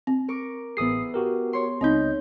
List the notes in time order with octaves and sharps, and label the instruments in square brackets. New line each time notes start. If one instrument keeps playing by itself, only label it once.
[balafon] C4
[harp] A#4 C#6 D6
[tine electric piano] A1 D#6 C7 [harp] B3 E4 G#4
[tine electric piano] F#4 G4 A#4
[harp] C#5 C6
[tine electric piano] C#2 D#5 G6 [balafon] C4 D#4